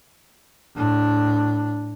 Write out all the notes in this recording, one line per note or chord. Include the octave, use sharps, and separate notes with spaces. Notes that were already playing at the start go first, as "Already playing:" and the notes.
A2 D4